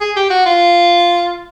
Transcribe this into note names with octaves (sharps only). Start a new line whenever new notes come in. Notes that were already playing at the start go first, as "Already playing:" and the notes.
G#4
G4
F#4
F4